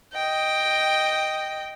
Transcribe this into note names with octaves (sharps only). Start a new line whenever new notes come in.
D#5 G5